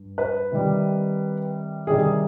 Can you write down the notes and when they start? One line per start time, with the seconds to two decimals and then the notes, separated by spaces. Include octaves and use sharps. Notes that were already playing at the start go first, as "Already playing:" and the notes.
Already playing: G2
0.18 B4
0.52 C3 D#3 G3
1.87 C3 D#3 G3 G#4